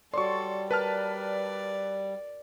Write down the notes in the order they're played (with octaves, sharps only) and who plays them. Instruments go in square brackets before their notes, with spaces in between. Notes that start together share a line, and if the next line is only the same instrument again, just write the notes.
[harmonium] G3 [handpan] F#4 C#5 D5 [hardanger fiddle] A4 [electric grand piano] C6 C#6
[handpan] A#4 [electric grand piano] B4 A5 F6 [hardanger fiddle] D5